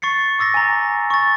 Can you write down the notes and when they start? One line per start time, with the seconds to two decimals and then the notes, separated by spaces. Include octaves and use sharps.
0.02 C#6 A6 C7 C#7
0.39 D6 E6 A6 A#6
0.54 G#5 A#5
1.10 C#6 A6